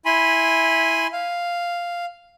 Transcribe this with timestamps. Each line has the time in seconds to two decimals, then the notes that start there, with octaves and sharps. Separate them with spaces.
0.06 E4 G#5 B5 C6
1.13 F5